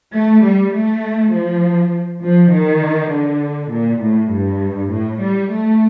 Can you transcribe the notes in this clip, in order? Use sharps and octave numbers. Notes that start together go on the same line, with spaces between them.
A3
G3
A3
F3
F3
D#3
D3
A#2
A2
G2
A2
G3
A3